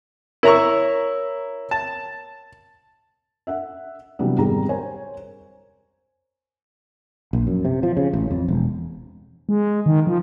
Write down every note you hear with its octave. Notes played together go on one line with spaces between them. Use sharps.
E4 A#4 C#5 A#5 C#6
A5
E5 F#5
C3 E3 F#3 G3 B3 D4
G#1 F2 G3 G#4 A#5
A#4 C5 C#5 G#5
A#1
F#2
C3
F3
C#3
A1
F2
E1
G#3
D#3
F3